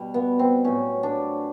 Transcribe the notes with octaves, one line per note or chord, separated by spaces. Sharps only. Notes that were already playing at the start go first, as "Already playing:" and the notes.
Already playing: B2 G3
B3
C4
A2 F#3 C#4
D4